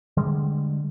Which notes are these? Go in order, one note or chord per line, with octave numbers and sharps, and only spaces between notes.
D3 G3 G#3